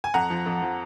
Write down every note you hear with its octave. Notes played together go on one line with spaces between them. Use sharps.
G#5
F2 F#5 A#5
F3
F2
F3